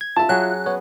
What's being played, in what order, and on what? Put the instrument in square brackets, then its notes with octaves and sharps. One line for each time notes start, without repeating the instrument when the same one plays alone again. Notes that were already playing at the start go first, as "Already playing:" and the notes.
[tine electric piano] G#6
[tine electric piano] F4 E5 [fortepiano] A5
[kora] F#3 C#4 G#4 [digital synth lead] F#6
[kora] B3 [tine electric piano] C#5